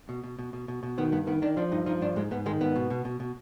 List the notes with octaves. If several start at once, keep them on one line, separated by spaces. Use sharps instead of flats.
B2
B2
B2
B2
B2
B2
D#3 B3
G2 B3
D#3 B3
D#3 D4
F3 D4
G2 D#4
F3 D#4
G2 D4
G#2 G#3
G#2 B3
D#3 G#3
G#2 B3
B2
B2
B2
B2